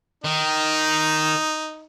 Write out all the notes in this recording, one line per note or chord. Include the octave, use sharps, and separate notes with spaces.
D#3 D#4